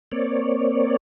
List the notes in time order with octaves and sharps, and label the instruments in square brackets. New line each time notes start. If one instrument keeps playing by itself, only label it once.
[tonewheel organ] A#3 C4 C#5 D5